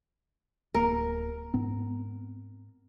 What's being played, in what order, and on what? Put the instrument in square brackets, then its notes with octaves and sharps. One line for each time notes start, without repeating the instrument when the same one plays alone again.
[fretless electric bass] D1 A#3 [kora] A#4
[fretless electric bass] G#2 B3 C4